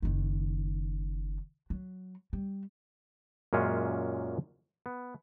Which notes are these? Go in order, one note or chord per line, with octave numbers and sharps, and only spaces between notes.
F#1 D#3
F#3
G3
F#2 A#2 G#3 C#4 F4
B3